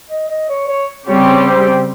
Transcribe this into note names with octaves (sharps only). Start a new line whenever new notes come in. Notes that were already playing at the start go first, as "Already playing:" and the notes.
D#5
D#5
C#5
C#5
C#3 G3 C4 G4 C#5
C5